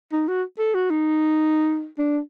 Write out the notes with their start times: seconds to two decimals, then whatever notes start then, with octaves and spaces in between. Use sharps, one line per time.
0.12 D#4
0.28 F#4
0.58 A4
0.74 F#4
0.90 D#4
1.98 D4